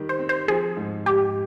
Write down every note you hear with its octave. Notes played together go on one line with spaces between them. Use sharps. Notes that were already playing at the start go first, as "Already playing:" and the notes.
Already playing: D#3 G3 G4
C5
C4
C5
F3 G#4
G#2
G#2 G4